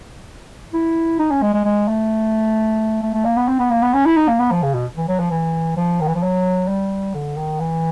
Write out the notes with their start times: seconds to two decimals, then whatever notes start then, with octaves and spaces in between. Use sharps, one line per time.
0.73 E4
1.19 D#4
1.31 C#4
1.42 G#3
1.54 G#3
1.65 G#3
1.88 A3
3.03 A3
3.14 A3
3.25 A#3
3.37 B3
3.48 C4
3.59 B3
3.71 A#3
3.82 B3
3.94 C#4
4.05 E4
4.17 D#4
4.28 A#3
4.40 B3
4.51 F3
4.63 C#3
4.74 B2
4.97 E3
5.08 F#3
5.19 F3
5.31 E3
5.76 F3
6.00 D#3
6.08 E3
6.15 F3
6.23 F#3
6.68 G3
7.14 D3
7.37 D#3
7.60 E3